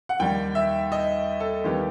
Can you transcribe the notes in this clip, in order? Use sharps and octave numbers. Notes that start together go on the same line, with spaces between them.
F#5
D#2 D#3 G3 G5
E5
D#5
A4
D#2 D#3 G3 B3 G4